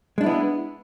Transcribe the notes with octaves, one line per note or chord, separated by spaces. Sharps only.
G#3 B3 D4 E4